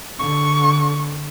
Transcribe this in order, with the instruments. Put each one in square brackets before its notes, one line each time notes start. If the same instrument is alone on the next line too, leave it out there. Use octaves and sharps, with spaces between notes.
[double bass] D3 [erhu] C#6